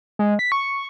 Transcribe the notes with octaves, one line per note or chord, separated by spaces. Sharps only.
G#3
B6
C#6